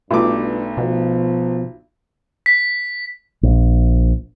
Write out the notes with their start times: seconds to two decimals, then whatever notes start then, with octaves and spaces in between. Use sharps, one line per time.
0.11 B1 G2 A3 F4 D6
0.77 B2 F3
2.46 B6
3.43 A#1